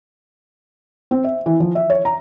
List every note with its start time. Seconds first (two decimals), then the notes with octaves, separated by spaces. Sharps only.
1.11 C4
1.24 E5
1.46 E3
1.60 F3
1.75 E5
1.90 C#5
2.05 A#5